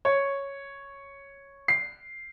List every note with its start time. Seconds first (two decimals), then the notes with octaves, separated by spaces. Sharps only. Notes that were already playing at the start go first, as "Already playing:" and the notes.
0.05 C#5
1.68 C7